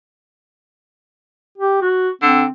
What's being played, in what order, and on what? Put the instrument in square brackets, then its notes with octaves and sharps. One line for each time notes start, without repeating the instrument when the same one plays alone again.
[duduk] G4
F#4
[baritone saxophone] D3 [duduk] C4